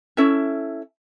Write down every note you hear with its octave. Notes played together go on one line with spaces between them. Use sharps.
C#4 E4 A4 E5